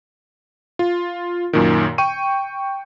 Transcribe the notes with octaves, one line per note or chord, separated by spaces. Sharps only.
F4
F#2 A#2 D#3
G5 C#6 D#7